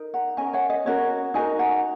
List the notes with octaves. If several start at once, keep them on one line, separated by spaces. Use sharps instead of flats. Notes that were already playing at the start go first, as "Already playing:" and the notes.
Already playing: D#4 A#4
F#5 A#5
C#4 A#4 D#5 G#5
C#5 F#5
D#5
C#4 F#4 A#4 C#5
D#4 F#4 A#4 D#5 G#5
F#5 A#5